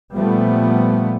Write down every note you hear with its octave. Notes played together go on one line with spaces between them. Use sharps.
A#2 F3 G3 A3 B3